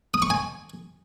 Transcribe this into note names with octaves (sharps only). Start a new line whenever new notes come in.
D#6
C#6
G#5